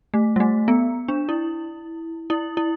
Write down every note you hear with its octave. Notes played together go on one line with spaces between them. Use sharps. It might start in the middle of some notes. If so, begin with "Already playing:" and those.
A3
G3
A3
B3
D4
E4
E4
E4